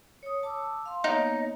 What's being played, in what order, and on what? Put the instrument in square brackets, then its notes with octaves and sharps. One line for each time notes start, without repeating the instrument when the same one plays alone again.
[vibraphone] C#5 D#6
A5 D6 E6
F5 C6
[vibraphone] A#3 B3 C#5 [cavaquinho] D#4